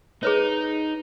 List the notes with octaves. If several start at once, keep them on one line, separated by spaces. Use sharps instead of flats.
D#4 G#4 B4 C#5